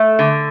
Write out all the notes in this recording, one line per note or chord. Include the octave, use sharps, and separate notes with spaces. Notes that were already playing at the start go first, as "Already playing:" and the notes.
Already playing: A3
D3